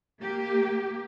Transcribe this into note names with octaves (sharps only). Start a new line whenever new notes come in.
A#3 G4